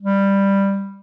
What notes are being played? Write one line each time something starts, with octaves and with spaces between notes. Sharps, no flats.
G3